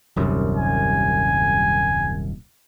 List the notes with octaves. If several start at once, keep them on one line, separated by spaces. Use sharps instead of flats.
D#1 C2 F#2
G#5